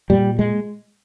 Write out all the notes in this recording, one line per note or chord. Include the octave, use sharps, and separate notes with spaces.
A#2 G3
G#3